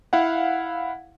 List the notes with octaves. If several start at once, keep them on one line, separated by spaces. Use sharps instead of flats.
E4 F5 F#5